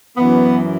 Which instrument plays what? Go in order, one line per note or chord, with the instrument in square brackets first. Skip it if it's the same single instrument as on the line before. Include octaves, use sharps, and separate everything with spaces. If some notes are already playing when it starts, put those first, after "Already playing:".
[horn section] F#2 E3 B3